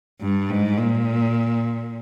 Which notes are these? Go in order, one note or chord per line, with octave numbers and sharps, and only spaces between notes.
G2
G#2
A#2